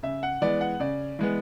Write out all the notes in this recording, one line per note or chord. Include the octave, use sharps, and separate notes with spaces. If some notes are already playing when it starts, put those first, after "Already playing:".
C#3 E5
F#5
E3 G#3 B3 D5
F#5
C#3 D5
E3 G#3 B3